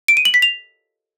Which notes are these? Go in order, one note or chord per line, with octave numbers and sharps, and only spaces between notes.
D7
D#7
F#7
B6
F7